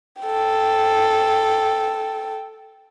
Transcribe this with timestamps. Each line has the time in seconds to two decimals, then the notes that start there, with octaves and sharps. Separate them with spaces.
0.22 A4 G5